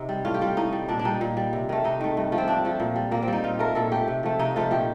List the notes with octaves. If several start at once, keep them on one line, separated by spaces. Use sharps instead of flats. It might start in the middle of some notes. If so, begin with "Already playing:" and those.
Already playing: C3 D#4
G3
A2 F4
G4
G3 F4
A2 D#4
G3
A#2 D4
D4
G3 D#4
A#2
G3
C3
D#3 A3
C3 D#4
D#3 A3
G2
F3 A3
C4
G2 D4
F3 A3
A#2
G3
A#2 A#3
C4
G3 D#4
A#2 F4
A3 A#4
A#2 A4
A3 G4
C3
F3 A3
C3 D#4
F3 A3 F4
A#2 G4